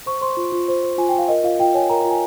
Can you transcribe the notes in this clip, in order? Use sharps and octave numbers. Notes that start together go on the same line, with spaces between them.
C5 C#6
C5 C6
F4
F4
C5
C5
F4 G#5
G5
F4
F5
A#4 D#5
F4 F5
F4 G5
C#5 G#5
A#4 A#5
F4 A#5
G#5